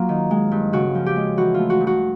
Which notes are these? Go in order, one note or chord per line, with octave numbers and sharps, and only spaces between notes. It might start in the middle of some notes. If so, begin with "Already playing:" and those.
Already playing: F#3 A#3 F4
D#3
G#3
G2
C#3 F#4
F3
G4
G#3
E3 F#4
A3 F4
F#4
G2
F#4